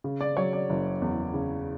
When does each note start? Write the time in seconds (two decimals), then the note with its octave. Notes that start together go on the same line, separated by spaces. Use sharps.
0.04 C#3
0.21 D5
0.37 F#3 C#5
0.53 D5
0.70 F#1
1.02 E2
1.34 C#3